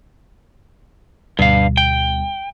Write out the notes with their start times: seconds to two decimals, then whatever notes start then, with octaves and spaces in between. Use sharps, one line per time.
1.39 D2 G2 B2 G3 F5
1.77 G5